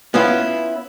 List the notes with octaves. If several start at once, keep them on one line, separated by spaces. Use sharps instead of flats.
B3 C#4 E4 F4